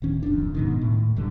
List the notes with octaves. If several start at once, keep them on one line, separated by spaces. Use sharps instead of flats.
D1 D#3 C#4
D1 B1 F2 D4
G#2 B2 D#3
A2
D1 F#2 D3 G3